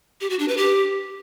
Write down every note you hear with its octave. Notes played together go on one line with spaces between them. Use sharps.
G4
F#4
D4
B4
G4